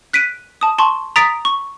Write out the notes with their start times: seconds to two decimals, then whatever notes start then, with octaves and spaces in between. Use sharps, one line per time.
0.13 F#6 B6 D7 D#7
0.61 A5 D#6
0.78 A5 C6 C#6
1.16 A#5 D#6 A6 B6 D7
1.45 C#6